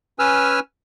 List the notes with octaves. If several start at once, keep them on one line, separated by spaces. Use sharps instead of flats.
C#4 B4 G#5 E6 F6